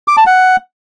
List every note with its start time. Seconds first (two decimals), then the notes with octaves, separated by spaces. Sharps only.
0.08 D6
0.17 A5
0.27 F#5